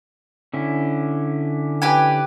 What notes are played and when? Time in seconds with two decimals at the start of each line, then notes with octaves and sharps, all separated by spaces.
0.54 D3 C#4 E4
1.82 G4 B4 G#5